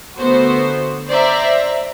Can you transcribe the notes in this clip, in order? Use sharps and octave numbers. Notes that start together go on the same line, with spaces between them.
D3 A3 B3 F#4 C5
C5 D5 E5 A#5